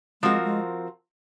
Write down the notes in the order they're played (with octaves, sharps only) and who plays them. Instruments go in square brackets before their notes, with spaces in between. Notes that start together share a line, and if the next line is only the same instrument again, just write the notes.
[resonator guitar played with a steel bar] F3 C4 F#4 A#4 [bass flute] G#3
[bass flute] G#3